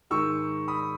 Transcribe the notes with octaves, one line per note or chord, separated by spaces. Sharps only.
G#2 D#3 G#3 C#6 E6
B5 D#6